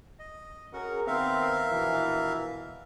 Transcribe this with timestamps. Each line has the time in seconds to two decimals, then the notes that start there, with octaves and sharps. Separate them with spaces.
0.19 D#5
0.73 C#4 F#4 G#4 A#4 F#5
1.07 D#3 B3 C4 A#4 E5 F5
1.71 A#1 B2 E3